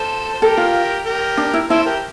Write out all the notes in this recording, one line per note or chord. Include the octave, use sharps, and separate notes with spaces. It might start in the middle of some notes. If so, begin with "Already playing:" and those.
Already playing: A4 C5
C5
G4 A4 A#4
F4
G4 A#4
D4
E4
E4 A4 C5
G4 A#4